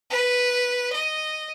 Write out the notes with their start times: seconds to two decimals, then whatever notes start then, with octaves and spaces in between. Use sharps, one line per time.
0.10 B4
0.92 D#5